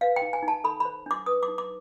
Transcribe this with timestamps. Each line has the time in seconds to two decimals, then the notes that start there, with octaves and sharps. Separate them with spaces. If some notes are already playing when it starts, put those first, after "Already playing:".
0.01 B4 F5
0.16 G5
0.22 D#4
0.33 G#5
0.43 D#4
0.48 A5
0.64 A4 B5
0.80 B5
0.85 C5
1.06 D4 D6
1.26 B4 D#6
1.43 D6
1.48 D#4
1.58 D6